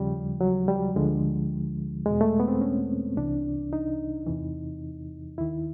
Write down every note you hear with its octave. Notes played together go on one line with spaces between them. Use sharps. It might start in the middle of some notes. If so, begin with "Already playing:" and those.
Already playing: D#2 C#3 F3 G3
F#3
G3
D2 D3 F3 G#3
E2 B2 G#3
A3
B3
C4
C#4
C2 C3 E3 D4
D#4
E2 C3 E3
D#2 D#3 E4